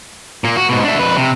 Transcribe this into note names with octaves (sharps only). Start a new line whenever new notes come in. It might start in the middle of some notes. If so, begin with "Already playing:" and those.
A#2 A#3
F#4
G#2 B2
D4 E5
F2 B4
C3